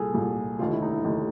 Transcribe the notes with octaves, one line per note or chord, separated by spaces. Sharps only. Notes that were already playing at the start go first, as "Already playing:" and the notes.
Already playing: C2 A#2 G#4 A4
C2 A#2
F1 D#2 D3 F4
E4
D#4
E4
F1 D#2 D3